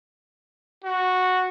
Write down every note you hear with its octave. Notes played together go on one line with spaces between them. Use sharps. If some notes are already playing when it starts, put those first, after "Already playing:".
F#4